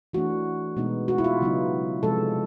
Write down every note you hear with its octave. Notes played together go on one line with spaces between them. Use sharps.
E3 A3 D4 F#4
B2 G#3 B3 D#4
F#4
E4
F4
C#3 F#3 B3 D#4
C3 F3 G#3 A4